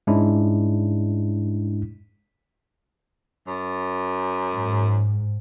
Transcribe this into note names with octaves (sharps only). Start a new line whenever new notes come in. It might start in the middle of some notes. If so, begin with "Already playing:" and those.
G#2 G#3 C#4 D4 E4
F#2
G#2